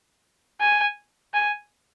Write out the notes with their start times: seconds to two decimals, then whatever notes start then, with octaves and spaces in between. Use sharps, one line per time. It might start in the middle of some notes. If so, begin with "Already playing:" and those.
0.61 G#5
1.34 G#5